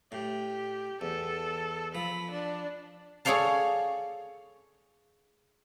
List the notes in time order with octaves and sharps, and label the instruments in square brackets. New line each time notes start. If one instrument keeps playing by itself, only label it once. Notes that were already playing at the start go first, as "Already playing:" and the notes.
[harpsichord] A2 [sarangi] G4
[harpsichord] E2 [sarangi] A4
[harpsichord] F3 [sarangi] B5
[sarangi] D4
[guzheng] G#4 A4 C#5 D5 F5 A5